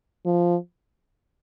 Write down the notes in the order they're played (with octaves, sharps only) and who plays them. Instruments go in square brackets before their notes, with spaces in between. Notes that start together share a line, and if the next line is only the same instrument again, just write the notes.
[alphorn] F3